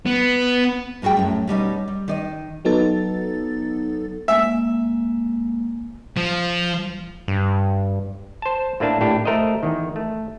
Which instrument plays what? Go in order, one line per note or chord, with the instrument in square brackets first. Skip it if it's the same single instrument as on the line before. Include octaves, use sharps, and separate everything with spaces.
[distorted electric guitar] B3
[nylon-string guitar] A2 G3 F#4 G#4 G5
F#2 A2
B2 G3 C#4 D#4
G3
D#3 D5 D#5
[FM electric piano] F#3 B3 D#4 A4 A6
[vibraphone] G#3 A#3 [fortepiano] E5
[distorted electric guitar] F3
[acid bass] G2
[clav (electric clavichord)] C5 A5
A2 A3 A#3 D4 A5
A2 D4 G4
A3 A#4 C5 D#5
E2 D#3
A3